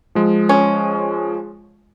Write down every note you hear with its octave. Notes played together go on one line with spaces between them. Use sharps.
F3 G#3
C#4